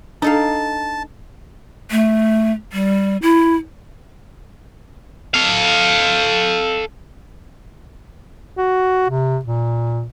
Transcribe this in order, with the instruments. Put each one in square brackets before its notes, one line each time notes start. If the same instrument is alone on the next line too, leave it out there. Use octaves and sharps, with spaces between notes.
[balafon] D4 [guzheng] D#4 A4 F5 [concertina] A5
[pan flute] A3
G3
E4
[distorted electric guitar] A4 F5
[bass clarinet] F#4
C3
A#2